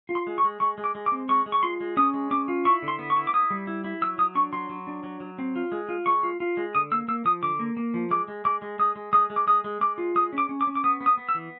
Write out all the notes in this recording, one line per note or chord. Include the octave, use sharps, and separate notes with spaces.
F4
C6
G#3
C#6
G#3
G#3 C#6
G#3
D6
G#3
D6
C4
G#3 C#6
G#3
C#6
F4 C6
G#3
C#4 D#6
G#3
C#4 D6
F4
E4 C#6
D3
C6
B3
C#6
E4
D6
E4 D#6
G3
E4
E4
F#3 E6
F#3 D#6
D4 C#6
F#3 C6
F#3
D4
F#3
F#3
C4
F4
G#3
F4
G#3 C#6
F4
F4
G#3
D3 D#6
A#3 E6
A#3 E6
F3 D#6
D3 D6
A#3
A#3
F3
G#3 D6
G#3
G#3 D6
G#3
G#3 D#6
G#3
G#3 D#6
G#3
D6
G#3 D#6
G#3
G#3 D6
F4
G#3 D#6
C#4
D6
C#4
D6
C#4
D6
B3 D#6
B3
D#6
B3
E6
E3